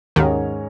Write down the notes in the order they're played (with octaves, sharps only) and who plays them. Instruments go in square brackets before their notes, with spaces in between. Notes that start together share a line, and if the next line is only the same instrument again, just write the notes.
[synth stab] D#2 D#3 [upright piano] G#2 G#3 C#4 A#4 C#5